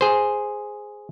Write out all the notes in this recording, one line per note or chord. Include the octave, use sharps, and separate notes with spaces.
G#4 C5